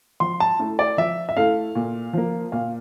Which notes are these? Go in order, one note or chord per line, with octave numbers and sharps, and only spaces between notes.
F3 C6
A5
A3 E4 A4
D5
F3 E5
E5
A3 E4 A4 F5
A#2
F3 A#3
A#2 F5